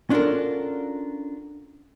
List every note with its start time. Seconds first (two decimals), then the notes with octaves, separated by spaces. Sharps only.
0.10 C#4 D4 F4 F#4 A4 A#4